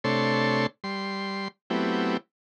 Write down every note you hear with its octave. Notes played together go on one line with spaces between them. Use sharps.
C3 A3 D4 A4 C#5 C6
G3 C6
F#3 A3 B3 C4 E4 G4